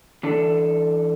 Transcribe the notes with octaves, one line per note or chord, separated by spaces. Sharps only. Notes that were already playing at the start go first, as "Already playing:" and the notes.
E3 D4 A4